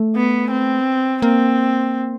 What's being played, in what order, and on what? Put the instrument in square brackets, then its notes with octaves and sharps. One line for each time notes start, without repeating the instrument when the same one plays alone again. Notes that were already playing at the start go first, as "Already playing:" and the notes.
Already playing: [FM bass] A3
[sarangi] B3
C4
[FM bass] A#3 [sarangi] C4